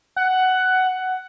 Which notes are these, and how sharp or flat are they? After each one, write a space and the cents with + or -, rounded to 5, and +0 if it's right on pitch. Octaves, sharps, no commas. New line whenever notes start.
F#5 +10